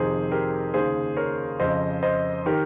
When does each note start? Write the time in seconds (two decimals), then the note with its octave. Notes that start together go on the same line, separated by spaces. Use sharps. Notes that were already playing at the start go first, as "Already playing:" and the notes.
Already playing: F2 C3 D#3 G#4 C5
0.31 G4 A#4
0.74 D#2 C#3 G#4 C5
1.17 A#4 C#5
1.60 F2 C#3 C5 D#5
2.03 C5 D#5
2.46 D#3 G4 A#4